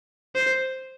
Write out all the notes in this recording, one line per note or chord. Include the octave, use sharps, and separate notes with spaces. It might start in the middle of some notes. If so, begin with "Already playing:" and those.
C5